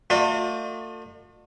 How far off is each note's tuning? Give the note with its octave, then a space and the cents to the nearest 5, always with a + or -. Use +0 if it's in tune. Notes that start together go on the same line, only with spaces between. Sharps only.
A3 +40 F4 +45 D5 +45